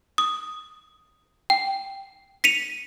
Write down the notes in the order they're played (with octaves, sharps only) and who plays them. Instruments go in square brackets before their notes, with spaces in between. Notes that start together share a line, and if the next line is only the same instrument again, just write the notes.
[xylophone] D#6
G5
B6 C#7 D#7 F7